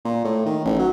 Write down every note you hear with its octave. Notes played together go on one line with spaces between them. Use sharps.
A#2
A2
D#3
A1
F#3